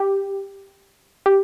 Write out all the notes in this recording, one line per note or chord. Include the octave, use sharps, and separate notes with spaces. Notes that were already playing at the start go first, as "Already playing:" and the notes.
Already playing: G4
G4